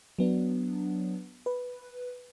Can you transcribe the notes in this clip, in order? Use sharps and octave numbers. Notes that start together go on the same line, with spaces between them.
F#3 B3 D4
B4